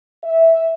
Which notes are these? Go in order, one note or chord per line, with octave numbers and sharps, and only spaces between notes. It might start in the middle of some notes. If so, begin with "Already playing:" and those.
E5